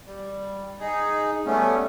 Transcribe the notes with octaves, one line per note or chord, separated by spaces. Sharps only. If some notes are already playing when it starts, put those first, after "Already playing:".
G3
D#4 G#4
G3 A3 B3 C#4